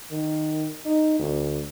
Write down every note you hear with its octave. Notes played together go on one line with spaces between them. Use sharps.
D#3
D#4
D2